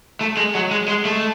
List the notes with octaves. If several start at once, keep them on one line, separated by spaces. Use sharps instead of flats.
A3
G#3
F#3
G#3
G#3
A3